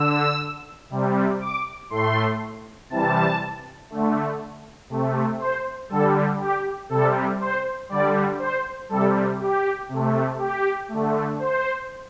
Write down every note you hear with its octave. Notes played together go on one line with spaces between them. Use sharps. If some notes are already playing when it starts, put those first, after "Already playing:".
Already playing: D3 E6
C3 G3
D6
A2 A3 C6
C3 E3 G3 A5
D3 A3
C3 A3
C5
D3 G3 A4
G4
C3 G3 A4
C5
D3 G3 D5
C5
C3 G3 A4
G4
C3 A3
G4
D3 A3
C5